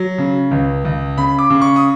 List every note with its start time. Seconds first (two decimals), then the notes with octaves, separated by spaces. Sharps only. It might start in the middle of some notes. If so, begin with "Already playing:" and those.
Already playing: F#3
0.18 C#3
0.51 C#2
0.85 C#2
1.17 C#3 B5
1.39 D6
1.50 C#3
1.61 C#6
1.76 D#6